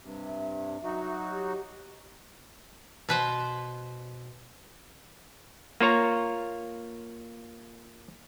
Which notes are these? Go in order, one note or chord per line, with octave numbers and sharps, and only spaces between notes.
G2 C3
E5
F#3 D#4 F#4
G4
B2 B4 C5
A#3 F4 C#5 A#5